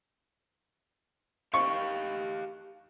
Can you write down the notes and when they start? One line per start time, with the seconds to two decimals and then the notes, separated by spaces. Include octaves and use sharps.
1.54 G4 D#5 F5 C#6